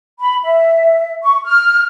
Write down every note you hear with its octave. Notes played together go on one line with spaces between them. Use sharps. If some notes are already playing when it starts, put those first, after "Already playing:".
B5
E5
C#6
F6